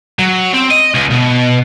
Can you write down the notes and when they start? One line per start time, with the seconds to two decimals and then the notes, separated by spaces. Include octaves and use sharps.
0.19 F#3
0.54 C4
0.71 D#5
0.95 C#2
1.11 B2